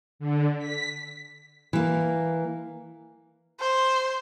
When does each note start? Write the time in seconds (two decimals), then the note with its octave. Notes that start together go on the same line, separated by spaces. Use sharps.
0.19 D3
0.58 B6
1.73 E3 A#3
3.60 C5